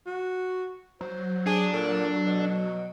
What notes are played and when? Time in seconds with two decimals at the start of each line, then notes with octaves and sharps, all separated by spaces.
0.06 F#4
1.01 F#3 C5
1.47 D4 G#4
1.73 A#2 A4
2.26 B2